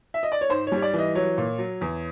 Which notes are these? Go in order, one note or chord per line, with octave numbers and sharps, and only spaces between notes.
E5
D#5
D5
C#5
G#2 C5
C#5
G3
C#5
D5
E3
D#5
F#3 C#5
A#2
F#3
E2